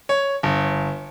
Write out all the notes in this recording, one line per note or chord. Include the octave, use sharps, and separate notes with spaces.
C#5
G1